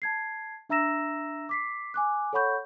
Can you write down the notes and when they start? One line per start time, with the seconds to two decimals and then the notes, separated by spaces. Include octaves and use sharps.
0.02 A5 G#6 C7
0.70 D4 E5 A#5 E6 A#6 E7
1.49 D6 B6 C7
1.94 G#5 D6 F#6
2.33 A4 C#5 F#5 B5 C#6 G6